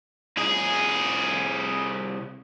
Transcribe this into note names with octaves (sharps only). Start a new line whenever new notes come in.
C2 G#4